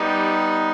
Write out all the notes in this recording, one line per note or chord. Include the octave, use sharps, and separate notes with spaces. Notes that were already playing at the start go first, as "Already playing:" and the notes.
Already playing: G3 B3 D#4 G4